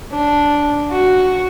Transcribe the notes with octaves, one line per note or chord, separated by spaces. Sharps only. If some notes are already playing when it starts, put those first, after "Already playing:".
D4
F#4